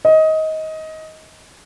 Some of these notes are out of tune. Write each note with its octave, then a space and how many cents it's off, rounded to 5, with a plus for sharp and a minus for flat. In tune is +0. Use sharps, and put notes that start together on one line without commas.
D#5 +20